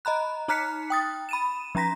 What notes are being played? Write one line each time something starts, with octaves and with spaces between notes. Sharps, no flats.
D#5 A#5 B5 F#6
D#4 A#5 F6 F#6 B6 C#7
G5 D#6 A6
B5 D#7 E7
F3 C#4 A#5 A#6 B6